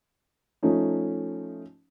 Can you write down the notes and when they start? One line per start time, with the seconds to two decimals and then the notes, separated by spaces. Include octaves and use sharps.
0.63 F3 A3 C#4 D#4